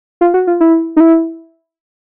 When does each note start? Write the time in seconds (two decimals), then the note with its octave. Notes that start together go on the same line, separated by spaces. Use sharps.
0.21 F4
0.34 F#4
0.47 F4
0.60 E4
0.96 D#4
1.00 E4